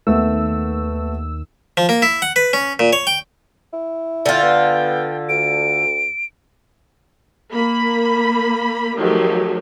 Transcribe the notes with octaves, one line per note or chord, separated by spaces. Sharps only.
D#2 A3 B3 E6
F3
A#3
E4
F#5
B4
C#4
A#2
C#5
G5
E4
D3 F4 G5
B3
D2 D7
A#3 B5
D#3 F3 F#3 A3 G4 G#4